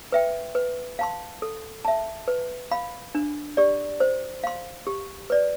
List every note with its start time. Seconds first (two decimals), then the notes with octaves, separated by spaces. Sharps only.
0.12 B4 E5 G5
0.55 B4
0.99 F5 A5 C6
1.42 A4
1.85 E5 A5
2.28 B4
2.71 F5 B5
3.15 D4
3.57 G4 D5
4.00 C5
4.44 F5 C6
4.87 G4
5.30 B4 D5